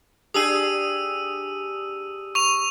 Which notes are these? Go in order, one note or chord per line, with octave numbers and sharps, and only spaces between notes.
D4 G4 G#4 D#6 E6 D#7
C#6 F7